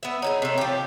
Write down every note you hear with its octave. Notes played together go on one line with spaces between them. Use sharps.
B3 E5
D#4 E4 G#4 C#5
C3 A3
F3 G4